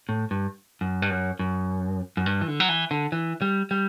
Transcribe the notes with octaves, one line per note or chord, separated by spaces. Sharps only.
A2
G2
F#2
G2
F#2
F#2
F#2
G2
E3
D3
F#3
E3
D3
E3
G3
G3